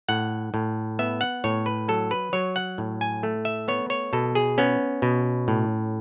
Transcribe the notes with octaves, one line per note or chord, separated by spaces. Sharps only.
A2 F#5
A2
B3 E5
F#5
A2 C#5
B4
F#3 A4
B4
F#3 C#5
F#5
A2
G#5
A3
E5
B3 C#5
C#5
B2 A4
G#4
B3 C#4
B2
A2